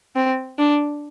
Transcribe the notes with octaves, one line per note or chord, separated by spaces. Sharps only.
C4
D4